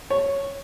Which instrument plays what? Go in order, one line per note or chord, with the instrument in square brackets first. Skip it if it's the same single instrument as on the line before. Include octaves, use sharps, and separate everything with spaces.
[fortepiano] C#5